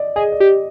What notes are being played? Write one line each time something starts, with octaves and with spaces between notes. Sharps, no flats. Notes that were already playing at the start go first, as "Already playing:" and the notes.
Already playing: D5 D#5
G#4 D#5
D5
G4